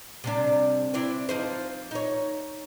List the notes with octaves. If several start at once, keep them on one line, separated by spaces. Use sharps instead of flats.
C3 G3 D4
C4 D4 E4
F3 D#4 C5
D#4 C#5